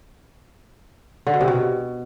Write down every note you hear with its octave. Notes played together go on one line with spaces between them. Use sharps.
D3
B2
C3
B2